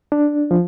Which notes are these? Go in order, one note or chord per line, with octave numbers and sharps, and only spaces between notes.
D4
F3